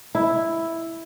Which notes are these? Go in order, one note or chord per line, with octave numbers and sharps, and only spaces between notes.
E4